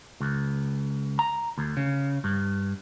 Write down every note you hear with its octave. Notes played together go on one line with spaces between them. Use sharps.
C#2
A#5
D2
C#3
G2